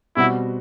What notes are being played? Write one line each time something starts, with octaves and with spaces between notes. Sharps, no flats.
B2 G3 C4 E4 F#4